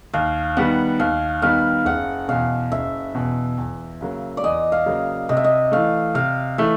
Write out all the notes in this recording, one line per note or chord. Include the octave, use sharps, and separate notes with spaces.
D#2 F5
D#3 G3 B3 F#5
D#2 F5
D#3 G3 B3 F5
F#1 F#5
E2 B2 F5
F#1 E5
E2 B2
E2
C#3 F#3 A#3
D5
E2 D#5
F5
C#3 F#3 A#3
C3 D#5
E5
D#5
E3 A3 F5
C3 F5
E3 A3 E5